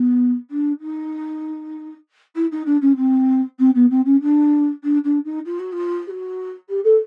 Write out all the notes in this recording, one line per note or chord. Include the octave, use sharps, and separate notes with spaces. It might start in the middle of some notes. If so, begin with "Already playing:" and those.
Already playing: B3
D4
D#4
E4
D#4
D4
C#4
C4
C4
B3
C4
C#4
D4
D4
D4
D#4
F4
F#4
F4
G4
F#4
G4
A4